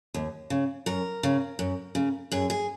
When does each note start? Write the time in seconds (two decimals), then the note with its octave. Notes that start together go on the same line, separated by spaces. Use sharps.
0.14 D#2
0.50 C#3
0.86 F#2 A#4
1.23 C#3
1.59 F#2
1.95 C#3
2.32 F#2 G#4
2.50 G#4